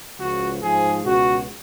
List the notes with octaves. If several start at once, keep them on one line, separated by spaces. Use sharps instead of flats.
C#2 C#3 F3 F#4
G#2 F3 G#4
C#2 B2 F#4